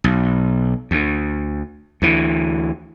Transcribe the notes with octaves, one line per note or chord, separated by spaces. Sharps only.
B1
D2
D2 E3